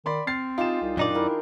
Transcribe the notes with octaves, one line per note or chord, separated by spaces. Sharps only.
D#3 D5 B5 C6
C4 F6 A6 C7
D#4 F4 G4 G#4 E7
C2
F#2 A#2 D#3 D4 D#4 D5
E4 A4 A#4 G5